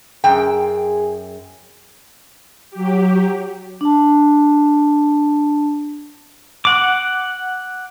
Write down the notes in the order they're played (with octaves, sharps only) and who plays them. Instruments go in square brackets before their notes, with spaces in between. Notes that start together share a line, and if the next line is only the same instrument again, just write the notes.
[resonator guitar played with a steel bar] F#2 G5 [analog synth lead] G#4
[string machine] F#3 G4
[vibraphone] D4 A5
[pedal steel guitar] F#5 D6